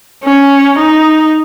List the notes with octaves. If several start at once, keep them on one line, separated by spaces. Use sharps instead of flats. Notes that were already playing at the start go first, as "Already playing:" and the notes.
C#4
D#4